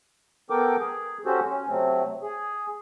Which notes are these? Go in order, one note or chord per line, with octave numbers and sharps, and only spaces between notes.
B3 A4 A#4 G5 D6
G#4
C#4 F#4 G4 A4 C5
C#4
C3 F#3 A3 C4
G#4